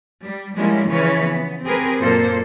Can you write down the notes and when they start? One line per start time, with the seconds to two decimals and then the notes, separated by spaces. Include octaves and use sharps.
0.22 G3
0.55 F3 G3 G#3 A#3 C#4 E4
0.88 C#3 E3 F3 C#4 B4 C#5
1.29 B3
1.64 C4 G4 G#4 A#4 B4
1.99 F#2 A#2 A#3 A4 C5